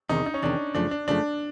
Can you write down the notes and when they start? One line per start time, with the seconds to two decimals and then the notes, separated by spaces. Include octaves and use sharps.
0.09 E2 C3 D#3 D#4
0.26 D#4
0.34 C#4
0.42 E2 C3 D#3 D4
0.75 F#2 C#3 F3 A3 D4
0.91 D4
1.08 F#2 C#3 F3 A3 D4